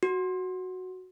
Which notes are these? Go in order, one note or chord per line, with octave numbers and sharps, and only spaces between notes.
F#4